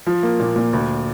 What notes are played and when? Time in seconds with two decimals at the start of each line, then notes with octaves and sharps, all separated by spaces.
0.07 F3
0.23 A#3
0.40 A#2
0.56 A#2
0.73 D2